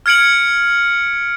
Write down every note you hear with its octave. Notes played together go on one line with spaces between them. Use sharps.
F6 G#6 C#7 D7 F#7